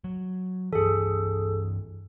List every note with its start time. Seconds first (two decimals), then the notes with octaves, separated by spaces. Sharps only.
0.04 F#3
0.73 G2 E3 G#4 A4